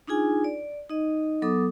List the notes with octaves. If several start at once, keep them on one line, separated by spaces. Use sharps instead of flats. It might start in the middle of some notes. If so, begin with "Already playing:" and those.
D4 D#4 F4 G#4 G#5
D5
D#4 D#5
F#3 B3 A4 D6 D#6